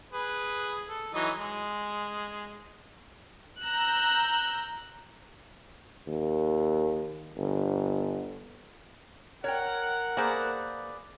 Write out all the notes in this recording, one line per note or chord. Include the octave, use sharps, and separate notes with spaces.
G#4 B4
A4
E3 F#3 D#4
G#3
A#5 E6 F#6 G6
D#2
G1
A#4 C#5 F#5 G5 F6 F#6
A#3 G#4 B4 C5 D5